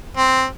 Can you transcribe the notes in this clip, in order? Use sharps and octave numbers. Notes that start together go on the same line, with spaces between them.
C4